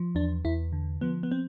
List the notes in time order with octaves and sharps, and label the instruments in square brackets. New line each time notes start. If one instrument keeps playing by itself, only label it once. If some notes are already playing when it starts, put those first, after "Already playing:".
Already playing: [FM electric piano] F3
E2 D4
E2 E4
D3
F3 B3
B3
C4